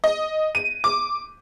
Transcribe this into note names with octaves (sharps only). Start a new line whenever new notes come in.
D#5
D#7
D6